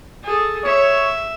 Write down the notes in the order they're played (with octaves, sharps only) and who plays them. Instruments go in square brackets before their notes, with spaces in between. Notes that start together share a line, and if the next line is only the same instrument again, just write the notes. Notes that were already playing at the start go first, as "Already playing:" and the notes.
[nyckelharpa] G#4 A4
[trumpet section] C#5 [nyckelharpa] E5